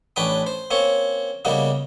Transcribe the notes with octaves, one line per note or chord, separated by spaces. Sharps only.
A1 C#4 D4 B4 G5 D#6
C5
A#3 C4 C#4 C#5
C#3 G3 A#3 B3 D#4